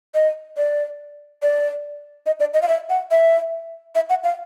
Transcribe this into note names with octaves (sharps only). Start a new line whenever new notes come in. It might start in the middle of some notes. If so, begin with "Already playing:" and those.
D#5
D5
D5
D#5
D5
D#5
F5
E5
F#5
E5
E5
F#5
F5